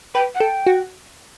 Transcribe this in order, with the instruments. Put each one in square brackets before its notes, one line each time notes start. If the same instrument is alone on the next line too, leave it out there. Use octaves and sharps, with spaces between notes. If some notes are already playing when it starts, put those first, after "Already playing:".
[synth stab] B4 [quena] G5
[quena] F#5
[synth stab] A4 [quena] G5
[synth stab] F#4